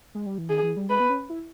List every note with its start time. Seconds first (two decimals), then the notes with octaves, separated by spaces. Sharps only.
0.15 G#3
0.26 G3
0.38 E3
0.49 D#3 G#4
0.63 E3
0.76 G3
0.89 G#3 B4
1.00 B3
1.10 C#4
1.30 E4